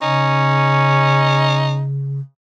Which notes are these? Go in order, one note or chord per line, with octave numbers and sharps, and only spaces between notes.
C#3 C#4 D#4